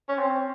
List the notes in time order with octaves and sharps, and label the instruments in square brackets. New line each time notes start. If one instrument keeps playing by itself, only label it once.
[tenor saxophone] C#4
C4